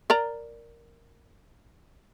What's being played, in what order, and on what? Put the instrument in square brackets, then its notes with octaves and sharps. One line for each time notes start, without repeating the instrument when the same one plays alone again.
[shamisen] A#4 D5 A#5